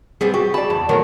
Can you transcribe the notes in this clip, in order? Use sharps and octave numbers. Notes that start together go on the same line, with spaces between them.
G3 B3 C4 G#4
F#4 G4
D5 A5 B5
E2
A2 D#3 F#3 G4 A#4 A#5